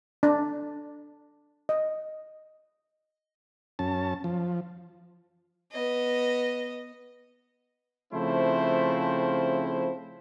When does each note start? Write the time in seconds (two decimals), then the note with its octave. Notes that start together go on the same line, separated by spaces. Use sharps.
0.23 D4
1.69 D#5
3.79 F#2 C#4 A5
4.24 F3
5.72 B3 D#5
8.13 C#3 F3 A3 C4 E4 C5